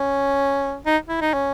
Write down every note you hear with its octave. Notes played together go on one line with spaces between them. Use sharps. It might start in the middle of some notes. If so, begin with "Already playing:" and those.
Already playing: C#4
D#4
E4
D#4
C#4